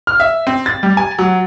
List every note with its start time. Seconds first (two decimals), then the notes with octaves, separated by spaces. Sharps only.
0.07 F6
0.20 E5
0.47 C4
0.66 A6
0.83 G3
0.97 G#5
1.19 F#3